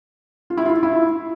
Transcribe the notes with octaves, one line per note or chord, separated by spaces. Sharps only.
F4
E4
F4
E4